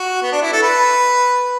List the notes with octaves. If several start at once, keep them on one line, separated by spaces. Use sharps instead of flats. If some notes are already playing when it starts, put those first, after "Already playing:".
Already playing: F#4
B3
D4
E4
A4
B4